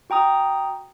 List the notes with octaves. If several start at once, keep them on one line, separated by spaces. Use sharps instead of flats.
F#4 G5 A#5 D#6